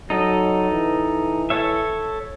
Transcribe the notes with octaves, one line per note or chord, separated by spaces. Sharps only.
F#3 D#4 A4 D#5
E3
A4 C#5 E5